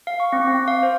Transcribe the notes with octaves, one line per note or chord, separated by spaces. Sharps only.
F5
C#6
C4
C4
F5
C5